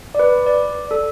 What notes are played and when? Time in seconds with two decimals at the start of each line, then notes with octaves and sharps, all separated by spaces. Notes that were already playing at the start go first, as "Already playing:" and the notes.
0.15 D5
0.19 B4
0.47 D5
0.91 A4